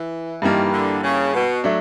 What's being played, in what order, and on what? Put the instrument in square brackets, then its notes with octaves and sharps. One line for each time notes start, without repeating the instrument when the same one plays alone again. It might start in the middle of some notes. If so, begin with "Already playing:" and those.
Already playing: [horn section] E3
[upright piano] G2 E3 G3 A#3 [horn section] D#3
[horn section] D3
C#3
B2
[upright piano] F#3 A3 D4